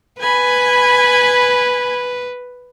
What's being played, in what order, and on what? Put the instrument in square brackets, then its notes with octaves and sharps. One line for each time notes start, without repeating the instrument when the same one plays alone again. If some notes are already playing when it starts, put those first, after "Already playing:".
[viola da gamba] B4 [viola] G#5 B5